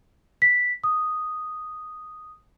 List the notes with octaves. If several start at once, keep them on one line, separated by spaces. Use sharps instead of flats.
B6
D#6